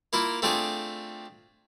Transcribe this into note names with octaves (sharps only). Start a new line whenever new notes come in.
A#3 E4 F4
A3 C4 D4 F4 G#4